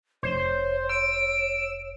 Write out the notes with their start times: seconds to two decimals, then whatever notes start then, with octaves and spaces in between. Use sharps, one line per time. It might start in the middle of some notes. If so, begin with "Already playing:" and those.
0.23 F1 C5 C#5
0.89 E6 D7